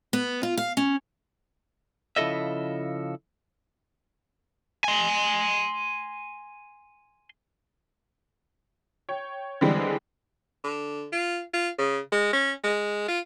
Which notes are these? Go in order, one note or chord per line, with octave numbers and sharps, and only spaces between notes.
B3
F4
F5
C#4
C#3 F3 E4 A4 D#5 E5
G#5 C6
C#5 G5
D3 E3 G3 G#3 C4
D3
F4
F4
C#3
G#3
C#4
G#3
F4